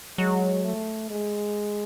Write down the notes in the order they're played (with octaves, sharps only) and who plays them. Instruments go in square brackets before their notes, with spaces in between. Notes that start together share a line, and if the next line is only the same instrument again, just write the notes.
[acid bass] F#3 [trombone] G#3
[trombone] A3
G#3